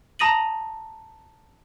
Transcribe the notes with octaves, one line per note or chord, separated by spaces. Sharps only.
A5 A#5 D#6 A#6 D#7 F#7